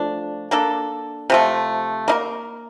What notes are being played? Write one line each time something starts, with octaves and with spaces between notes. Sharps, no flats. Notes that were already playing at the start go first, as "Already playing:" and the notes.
Already playing: F3 A3 D4
A#3 D4 A4
C3 F3 A3
A#3 D#4 A#4